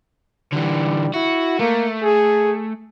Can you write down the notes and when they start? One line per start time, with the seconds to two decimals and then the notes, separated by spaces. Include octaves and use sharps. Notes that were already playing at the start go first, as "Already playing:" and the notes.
0.53 D3 E3 G3
1.14 E4 F#4
1.59 A3 A#3
2.03 G#4